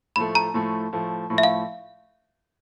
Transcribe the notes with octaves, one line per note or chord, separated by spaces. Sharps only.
A2 F3 A3 B5
A#5
A2 F3 A3
A2 F3 A3
A2 F3 A3
E5
F5